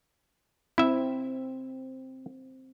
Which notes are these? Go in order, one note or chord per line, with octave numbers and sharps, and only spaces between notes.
C4 E4 E5